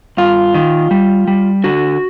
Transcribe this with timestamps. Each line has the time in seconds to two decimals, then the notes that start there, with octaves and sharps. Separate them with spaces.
0.17 G2 F4
0.54 D#3
0.91 G3
1.28 G3
1.64 D3 F#4